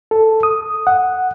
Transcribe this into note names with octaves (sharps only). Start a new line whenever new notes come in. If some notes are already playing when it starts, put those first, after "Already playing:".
A4
D#6
F#5